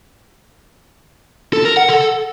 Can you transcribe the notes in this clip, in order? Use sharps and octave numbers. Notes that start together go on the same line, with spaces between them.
A4
A#4
F#5
A4